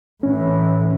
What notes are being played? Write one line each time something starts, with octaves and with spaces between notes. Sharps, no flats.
A2 E3 C#4